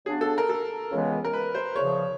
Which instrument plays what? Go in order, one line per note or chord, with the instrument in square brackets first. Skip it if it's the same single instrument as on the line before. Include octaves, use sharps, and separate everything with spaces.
[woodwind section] C#3 F#3 B3 D4 [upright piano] G#4
[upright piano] A4
A#4
A4
[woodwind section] C#2 C#3 E3 G#3 B3
[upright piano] A#4
B4
C5
[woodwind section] E2 C#3 F3 [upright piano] C#5